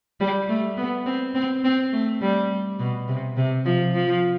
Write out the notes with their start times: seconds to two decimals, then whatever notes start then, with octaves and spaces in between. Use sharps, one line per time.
0.20 G3
0.49 A3
0.77 B3
1.06 C4
1.34 C4
1.64 C4
1.92 A3
2.21 G3
2.79 B2
3.08 C3
3.37 C3
3.65 F3
3.94 F3